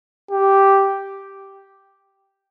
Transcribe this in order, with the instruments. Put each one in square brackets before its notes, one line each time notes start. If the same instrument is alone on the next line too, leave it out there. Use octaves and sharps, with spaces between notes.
[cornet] G4